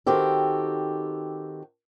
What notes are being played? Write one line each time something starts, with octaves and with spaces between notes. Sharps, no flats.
D#3 C4 F#4 G4 A4